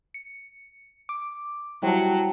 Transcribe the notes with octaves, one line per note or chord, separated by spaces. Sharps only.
C#7
D6
F#3 G3 E4 C5 G5 A5